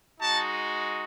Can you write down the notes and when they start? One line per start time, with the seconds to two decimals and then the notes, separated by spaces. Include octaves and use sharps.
0.20 G#3 D#4 F#4 A5